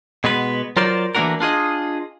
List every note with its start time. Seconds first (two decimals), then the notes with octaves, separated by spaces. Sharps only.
0.24 B2 G#3 B3 B4
0.76 F#3 F4 A#4 C5 D5
1.15 E3 A3 A#3 D4 F#4 A#4
1.40 D4 F4 G#4 D#5